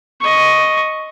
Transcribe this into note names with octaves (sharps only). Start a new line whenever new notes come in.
D#5 C#6